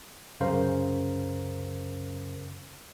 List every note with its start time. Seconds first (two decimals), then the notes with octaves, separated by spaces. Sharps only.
0.40 C2 F#2 C#3 A#4 C5 F5